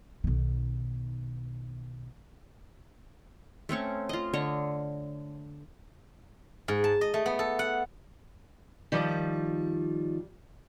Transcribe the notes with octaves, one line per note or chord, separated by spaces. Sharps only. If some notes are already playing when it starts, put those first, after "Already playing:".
B1 D#3
A3 C4 C#4 C#6
F4 D#5
D3 C#5 D#5
G#2
A5
D#5
A3
B3
A4
F#5
D#3 F3 G3